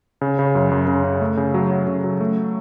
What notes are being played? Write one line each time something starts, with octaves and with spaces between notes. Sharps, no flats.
C#3
C#3
F#2
F#2
C#3
C#3
A3
C#3
F#3
F#3
C#3
F#3
A3